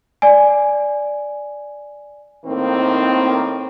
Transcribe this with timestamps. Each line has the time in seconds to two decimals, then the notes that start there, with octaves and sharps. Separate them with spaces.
0.22 D5 G#5
2.45 A2 D#3 A#3 C4 D#4